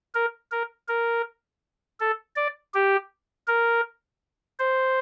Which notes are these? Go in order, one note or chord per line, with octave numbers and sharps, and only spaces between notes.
A#4
A#4
A#4
A4
D5
G4
A#4
C5